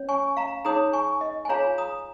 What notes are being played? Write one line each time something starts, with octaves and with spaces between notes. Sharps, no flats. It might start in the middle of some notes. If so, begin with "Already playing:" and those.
Already playing: C#4 C#5
G#5 C#6
F5 A#5
D#4 G#4 C#5 A#5 D#6
G#5 C#6
D#5
G#5
F4 G#4 C#5 F5 A#5
A#5 D#6